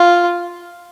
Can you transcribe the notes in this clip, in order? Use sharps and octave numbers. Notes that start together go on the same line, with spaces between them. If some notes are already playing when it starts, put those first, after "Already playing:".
Already playing: F4